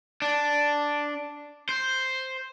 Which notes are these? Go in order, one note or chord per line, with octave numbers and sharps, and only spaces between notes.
D4
C5